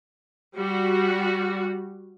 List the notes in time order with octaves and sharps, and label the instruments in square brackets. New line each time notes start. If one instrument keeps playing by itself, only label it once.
[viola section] G3 F#4